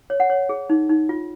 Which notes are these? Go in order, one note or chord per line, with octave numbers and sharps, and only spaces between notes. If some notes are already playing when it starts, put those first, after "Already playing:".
C#5
F#5
C#5
G#4
D#4
D#4
F4